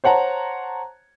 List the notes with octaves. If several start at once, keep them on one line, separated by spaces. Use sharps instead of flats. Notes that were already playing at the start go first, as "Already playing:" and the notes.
C5 C#5 F#5 A5 A#5